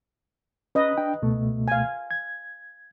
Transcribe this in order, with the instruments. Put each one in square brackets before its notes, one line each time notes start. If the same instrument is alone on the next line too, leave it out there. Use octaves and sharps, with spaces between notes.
[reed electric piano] C#4 [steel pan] B4 D#5
[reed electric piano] D4 G5
C#2 B2 A3
[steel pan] F5 G#5
[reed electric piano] G#6